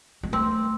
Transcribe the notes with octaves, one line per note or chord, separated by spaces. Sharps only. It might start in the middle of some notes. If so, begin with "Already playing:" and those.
G#3
A3 C4